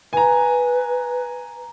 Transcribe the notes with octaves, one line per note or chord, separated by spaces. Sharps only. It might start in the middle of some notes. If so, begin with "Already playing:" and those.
B4 G#5 A#5